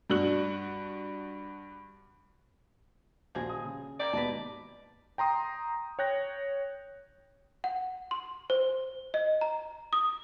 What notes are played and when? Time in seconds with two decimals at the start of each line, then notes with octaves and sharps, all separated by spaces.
0.10 G2 D4 F#4 F#6 F#7
3.35 D#1 A#1 F3 G#3 F#4 G#4
3.49 D#6
3.64 C#3
4.00 G3 A#3 G4 D5
4.13 D#2 G#2 B2 B4 D#5 A5
5.18 G5 A#5 C6 D#6
5.99 C#5 G5 F#6 G6 A#6
7.64 F#5
8.11 C6
8.50 C5
9.14 D#5
9.41 A#5
9.93 D#6